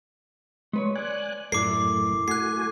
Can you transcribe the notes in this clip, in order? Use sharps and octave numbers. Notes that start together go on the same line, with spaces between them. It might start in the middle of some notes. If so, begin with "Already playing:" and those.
G#3 B4 C#5
D5 G#5 F#6
F#2 A2 E4 A4 A#4 D6 C7
A3 F#4 G#5 F#6 C7